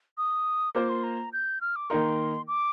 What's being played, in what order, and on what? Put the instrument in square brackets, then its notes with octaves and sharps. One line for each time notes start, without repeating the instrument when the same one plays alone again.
[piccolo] D#6
[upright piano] A#3 F4 C5 [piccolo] D6
[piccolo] C6
A#5
G6
F6
D6
[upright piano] D#3 A#3 D#4 A#4 [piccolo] C6
[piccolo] D6